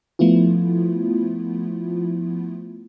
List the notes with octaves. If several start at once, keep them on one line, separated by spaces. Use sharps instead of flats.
F3 A3 B3 E4 F4